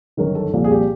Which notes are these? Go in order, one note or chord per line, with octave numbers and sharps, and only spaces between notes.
G1 F#2 D#3 A#4
A4
C2 A#2 F3
G#4
G4